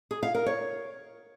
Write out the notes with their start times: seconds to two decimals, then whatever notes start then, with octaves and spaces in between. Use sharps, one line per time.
0.11 G#4
0.23 F5
0.35 A#4
0.46 C#5